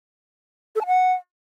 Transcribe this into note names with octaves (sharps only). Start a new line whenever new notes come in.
A4
A5
F#5